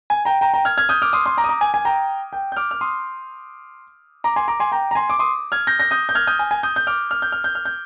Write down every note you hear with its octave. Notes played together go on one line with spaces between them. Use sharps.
G#5
G5 A#5
G5 A#5
G5 A#5
F6 G#6
F6 G#6
D#6 G6
D6 F6
C6 D#6
C6 D#6
A#5 D6
D#6
A#5 D6
G#5
G#5
G5 A#5
G5
G6
D6 F6
F6
C6 D#6
A#5 D6
G#5 C6
A#5 D6
G#5 C6
G5 A#5
A#5
G#5 C6
D6
C6 D#6
F6 G#6
G6 A#6
G6 A#6
D#6 G6
G6
F6 G#6
D#6 G6
G#5
G#5
D#6 G6
G6
D6 F6
F6
G6
F6
G6
F6
G6